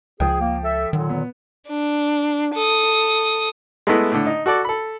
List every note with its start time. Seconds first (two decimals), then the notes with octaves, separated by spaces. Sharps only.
0.20 C#2 F3 G#4 G5
0.40 A#3
0.64 A4 E5
0.93 A#2 D3 D#3 F#3
1.10 B3
1.68 D4
2.55 A4 D#6
3.87 G#3 A3 B3 E4
4.12 A2 D3
4.27 D#4
4.46 F#4 A4 D5
4.65 A4 B5